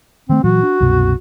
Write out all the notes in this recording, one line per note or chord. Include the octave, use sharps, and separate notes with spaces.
D#3 A3 C4
A#2 E3 F#3 F#4
D4
C2 F#2 B2